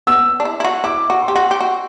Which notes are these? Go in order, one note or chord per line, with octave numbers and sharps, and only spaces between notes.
B3 E6
D4
E4
E4
F#4
E4 D6
F#4
C6
G4
F#4
G4
F#4